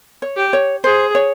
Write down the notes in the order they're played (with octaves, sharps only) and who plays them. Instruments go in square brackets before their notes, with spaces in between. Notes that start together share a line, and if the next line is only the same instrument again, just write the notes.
[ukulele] C#5
[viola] G4
[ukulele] C#5
[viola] G#4 [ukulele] C5
[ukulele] C#5